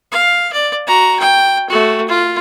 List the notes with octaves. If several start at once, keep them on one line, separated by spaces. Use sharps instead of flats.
F5
D5
F#4 A#5
G5
A3 F#4
F4